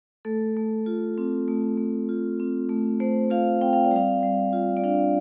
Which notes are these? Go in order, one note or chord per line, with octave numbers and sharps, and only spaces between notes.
A3 A4
A3
F4
C4
A3
A3
F4
C4
A3
A3 C5
F4 F5
C4 G5
F5
D5
G3 F5
G3
F4
D5
D4 F5